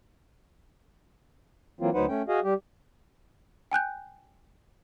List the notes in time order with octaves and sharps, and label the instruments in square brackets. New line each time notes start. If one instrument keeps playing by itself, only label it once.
[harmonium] E3 F#3 A#3 C4 F4
D2 F#3 D#4 B4 C5 F#5
A3 C#4 G5
F#4 G#4 D#5 F5
G3 G4
[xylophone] G5 G#5 F#6 G6